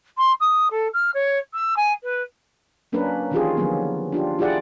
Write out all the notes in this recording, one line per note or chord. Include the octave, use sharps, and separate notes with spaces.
C6
D#6
A4
F6
C#5
E6
G#5
B4
F#3 A#3 C#4 D4 A#4 B4
D#3 E3 C#4 F4 G4 G#4
D3 D#3 F3 F#3 A#3 B3
D4 F4 G4
E4 F4 G4 G#4 D5 F#5